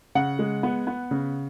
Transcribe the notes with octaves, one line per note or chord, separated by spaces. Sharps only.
C#3 F#5
G#3
B3
B3
C#3